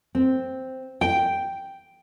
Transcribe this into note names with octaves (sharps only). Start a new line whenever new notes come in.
C4
G5